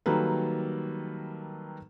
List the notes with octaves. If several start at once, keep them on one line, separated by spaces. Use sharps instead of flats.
D#3 F#3 G3 A#3 A4 B4